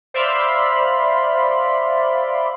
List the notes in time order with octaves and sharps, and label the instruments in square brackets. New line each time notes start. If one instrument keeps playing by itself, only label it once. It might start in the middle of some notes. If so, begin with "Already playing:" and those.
[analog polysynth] C5 D5 E5 F5 B5 C6